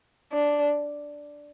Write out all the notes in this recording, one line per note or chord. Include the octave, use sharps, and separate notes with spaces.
D4